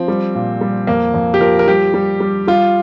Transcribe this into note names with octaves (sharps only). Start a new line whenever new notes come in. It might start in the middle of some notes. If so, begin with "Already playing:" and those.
Already playing: F3 C4
G3
A#2
G3
F2 A#3
F2
G4
F3 A#4
A#4
G3 G4
G3
G3
G3 F4